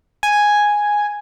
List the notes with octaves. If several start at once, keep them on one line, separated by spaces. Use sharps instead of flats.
G#5